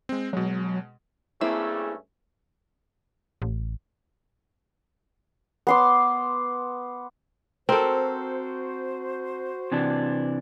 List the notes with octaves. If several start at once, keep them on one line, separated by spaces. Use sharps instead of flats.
G#3 C4
B2 F#3 G#3
G2 A3 A#3 C4 C#4 E4 G#4
A1
B3 C6 D6
C4 F#4 A4 A#4 C5
C3 E3 D4